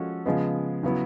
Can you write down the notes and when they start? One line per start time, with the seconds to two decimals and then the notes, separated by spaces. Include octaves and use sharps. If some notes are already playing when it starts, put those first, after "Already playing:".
Already playing: F3 G#3 C#4 F#4 A4
0.26 C#3 F3 G#3 B3
0.83 C#3 F#3 B3 E4